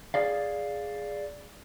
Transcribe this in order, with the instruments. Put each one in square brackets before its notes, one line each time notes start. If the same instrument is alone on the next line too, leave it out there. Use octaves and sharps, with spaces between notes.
[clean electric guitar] G#4 D5 F5